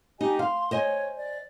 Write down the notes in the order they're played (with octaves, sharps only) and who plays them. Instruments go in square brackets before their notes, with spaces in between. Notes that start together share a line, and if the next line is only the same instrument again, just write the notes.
[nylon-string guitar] D#4 [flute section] G4 D#5 G#5
[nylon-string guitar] F5 [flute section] C6
[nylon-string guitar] C5 D#5 G#5 [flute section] C#5
[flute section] D5